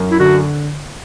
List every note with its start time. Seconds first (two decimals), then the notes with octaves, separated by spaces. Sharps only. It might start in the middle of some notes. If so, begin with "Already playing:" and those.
Already playing: F#2
0.11 E4
0.19 D3 F#4